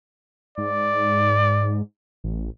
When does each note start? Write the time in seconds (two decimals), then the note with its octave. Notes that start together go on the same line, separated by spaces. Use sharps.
0.58 G#2 D5
2.24 A1